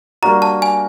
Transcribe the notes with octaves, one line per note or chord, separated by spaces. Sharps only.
G3 A#3 D4 F#4 A#5
A5
G#5